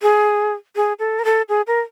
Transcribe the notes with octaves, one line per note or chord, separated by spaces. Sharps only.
G#4
G#4
A4
A#4
A4
G#4
A#4